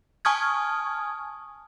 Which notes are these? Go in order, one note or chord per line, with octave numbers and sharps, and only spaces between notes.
G#5 A5 C#6 D#6 F6 G#6